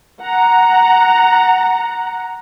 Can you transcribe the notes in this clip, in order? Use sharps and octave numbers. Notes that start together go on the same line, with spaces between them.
F#5 A#5